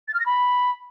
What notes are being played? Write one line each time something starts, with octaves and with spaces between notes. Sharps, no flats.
A6
F6
A#6
B5